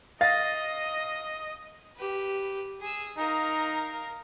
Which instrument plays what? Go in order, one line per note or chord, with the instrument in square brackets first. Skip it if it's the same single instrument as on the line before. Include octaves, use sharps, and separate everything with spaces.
[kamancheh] D#5 [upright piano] F5 [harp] A6 A#6
[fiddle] G4 B4
G#4 E6
[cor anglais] D#4 [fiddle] A#4 F5